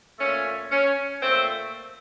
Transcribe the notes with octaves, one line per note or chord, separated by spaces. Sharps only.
A#2 A3 C#4
C#4
A#2 A3 C4